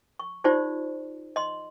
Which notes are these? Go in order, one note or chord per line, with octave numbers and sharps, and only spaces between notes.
C#6
D#4 F4 G4 C5 D5
D#5 C6